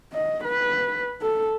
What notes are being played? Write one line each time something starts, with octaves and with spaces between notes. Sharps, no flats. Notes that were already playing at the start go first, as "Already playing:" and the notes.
D#5
B4
A4